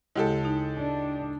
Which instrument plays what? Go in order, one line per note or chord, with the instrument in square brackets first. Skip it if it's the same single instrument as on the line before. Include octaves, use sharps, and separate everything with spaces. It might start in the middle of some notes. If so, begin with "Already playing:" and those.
[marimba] D2 C#3 E4 [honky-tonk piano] G#3 G4 A4
[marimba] D#4
[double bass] D4